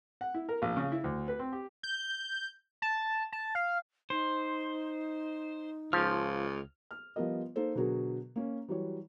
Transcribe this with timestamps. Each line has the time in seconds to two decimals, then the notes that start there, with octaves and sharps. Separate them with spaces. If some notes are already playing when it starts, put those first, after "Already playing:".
0.21 F#5
0.34 E4
0.49 A#4
0.62 A#1
0.77 C#3
0.92 E4
1.04 D2
1.28 B4
1.39 C4
1.53 G4
1.83 G6
2.82 A5
3.32 A5
3.55 F5
4.10 D#4 C5
5.93 C#2 F3 F6
6.91 F6
7.16 F3 G3 B3 F4 A#4 D#5
7.56 A#3 D#4 A4 C5
7.75 B2 D3 F#3 F#4 G#4 A#4
8.36 A#3 C#4
8.68 E3 F#3 G3 C#5